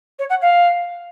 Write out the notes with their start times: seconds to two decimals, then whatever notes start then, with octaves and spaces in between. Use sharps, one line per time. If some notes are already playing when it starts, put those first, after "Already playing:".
0.19 C#5
0.29 F#5
0.42 F5